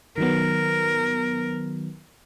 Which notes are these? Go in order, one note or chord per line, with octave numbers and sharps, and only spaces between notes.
D#3 F#3 B3 A#4